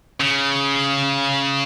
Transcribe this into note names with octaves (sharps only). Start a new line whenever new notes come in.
C#3